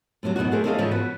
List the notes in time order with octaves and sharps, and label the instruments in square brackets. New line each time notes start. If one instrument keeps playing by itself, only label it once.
[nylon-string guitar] A2 C3 E3 F#3
F#2 B2 D#3 D#4 F#4
A3 G#4 A#4 C5
D#2 C#4 E4 A4 D#5 F5
G#2 C#3 E3 F3
B3 F#4 B4